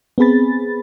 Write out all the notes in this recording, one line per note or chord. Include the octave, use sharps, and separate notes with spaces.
B3 C4 G#4 B5 A6